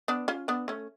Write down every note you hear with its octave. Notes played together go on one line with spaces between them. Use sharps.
B3 D4
C#4 F4
B3 D4
A3 C#4